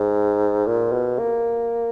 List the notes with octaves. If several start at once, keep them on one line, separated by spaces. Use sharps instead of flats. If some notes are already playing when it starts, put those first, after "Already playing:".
Already playing: G#2
A#2
B2
A#3